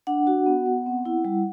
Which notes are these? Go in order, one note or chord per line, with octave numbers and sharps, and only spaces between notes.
D4 F#5
F#4
B3
B3
C4
E4
G3